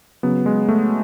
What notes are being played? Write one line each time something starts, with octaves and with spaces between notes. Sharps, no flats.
C#3 F#3 B3
G#3
A3